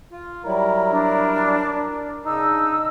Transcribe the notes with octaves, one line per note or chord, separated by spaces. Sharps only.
F4
F#3 G3 E4 A#4
D4
D4
C#3 D4 D#4 E6